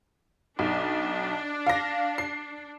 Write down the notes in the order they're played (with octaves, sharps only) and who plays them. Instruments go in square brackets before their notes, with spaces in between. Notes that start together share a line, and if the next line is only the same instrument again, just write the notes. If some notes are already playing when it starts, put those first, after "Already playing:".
[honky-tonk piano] B1 [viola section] D4
[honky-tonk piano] F5 A#6
C7